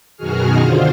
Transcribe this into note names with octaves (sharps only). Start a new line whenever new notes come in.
F#2 B2 D#3 F#4 G#4 F6
D3 F4 C5